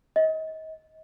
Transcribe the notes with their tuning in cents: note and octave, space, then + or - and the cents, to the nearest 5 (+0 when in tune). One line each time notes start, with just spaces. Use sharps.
D#5 +30